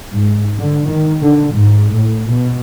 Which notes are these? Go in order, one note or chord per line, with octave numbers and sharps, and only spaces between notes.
G#2
D3
D#3
D3
G#2
A2
B2